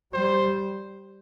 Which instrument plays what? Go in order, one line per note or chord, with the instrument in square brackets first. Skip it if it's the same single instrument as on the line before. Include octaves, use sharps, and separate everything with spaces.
[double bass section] G3 [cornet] C5